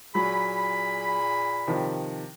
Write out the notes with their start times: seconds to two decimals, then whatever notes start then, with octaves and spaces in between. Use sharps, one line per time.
0.15 A#2 F#3 G#4 B5
1.67 C3 D#3 F3